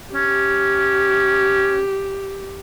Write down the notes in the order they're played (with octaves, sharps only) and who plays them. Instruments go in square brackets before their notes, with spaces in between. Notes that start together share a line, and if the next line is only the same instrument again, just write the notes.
[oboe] C#4 [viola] G4